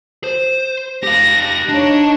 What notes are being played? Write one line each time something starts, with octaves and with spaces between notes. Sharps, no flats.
C5
G4 F5 A#6
D4 D#4 C#5